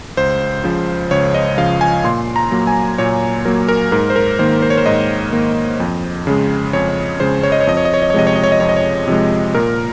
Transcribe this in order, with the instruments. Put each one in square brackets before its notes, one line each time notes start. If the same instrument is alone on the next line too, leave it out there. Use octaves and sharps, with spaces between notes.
[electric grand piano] C#2 C5
C#3 F3
C#2 C#5
D#5
C#3 F3 F5
G#5
A#2 C6
A#5
F#3 A#3
G#5
A#2 C#5
F#3 A#3 A#4
A#4
G#2 A#4
C5
A#4
D#3 A#3 C5
C5
C#5
C5
G#2 D#5
D#3 A#3
F2
C#3 G#3
F2 C#5
C#3 G#3 C5
C#5
D#5
C#5
F2 D#5
C#5
D#5
C#5
D#5
C#5
C3 F3 G#3 D#5
C#5
D#5
C#5
D#5
F2 C#5
D#5
C#5
C3 F3 G#3
A#2 A#4